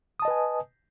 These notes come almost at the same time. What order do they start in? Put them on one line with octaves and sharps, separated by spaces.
D#6 A5 D#5 B4 G#5